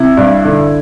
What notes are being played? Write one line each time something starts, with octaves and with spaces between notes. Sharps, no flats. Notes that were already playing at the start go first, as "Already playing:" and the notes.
Already playing: C3 E4
G2
D3